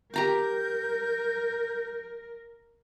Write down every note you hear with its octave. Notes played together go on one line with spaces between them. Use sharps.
G4 A#4 A#5 D6 G6